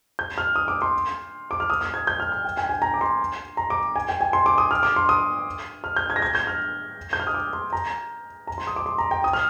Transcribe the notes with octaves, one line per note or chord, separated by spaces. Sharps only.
G6
F6
D#6
D6
C6
D6
F6
D#6
D#6
G#6
G6
F6
F6
G5
G#5
G5
G#5
A#5
D6
C6
A#5
D6
G#5
G5
G#5
C6
D6
D#6
F6
D6
C6
D#6
F6
G6
G#6
A#6
G#6
G6
F6
G6
F6
D#6
D6
C6
A#5
A#5
C6
D#6
D6
C6
A#5
G5
D#6
F6